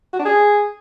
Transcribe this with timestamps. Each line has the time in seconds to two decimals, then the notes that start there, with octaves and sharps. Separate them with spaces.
0.13 F#4
0.19 D4
0.25 G#4